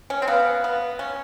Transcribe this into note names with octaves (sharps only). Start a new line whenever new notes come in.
C#4
C4
B3 F5
B3
C#4